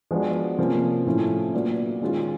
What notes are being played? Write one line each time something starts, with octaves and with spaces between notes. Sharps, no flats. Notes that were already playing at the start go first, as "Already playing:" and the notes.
F3 G#3 B3 D4 F#4
C3 F3 A#3 C#4
A2 F3 A3 C#4 E4
A#2 F#3 B3 D4
D#3 G#3 C#4 F4